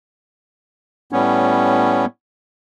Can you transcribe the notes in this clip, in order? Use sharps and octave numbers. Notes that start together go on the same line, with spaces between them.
A2 G3 B3 C#4